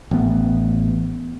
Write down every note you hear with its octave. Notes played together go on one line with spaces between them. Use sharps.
A1 B3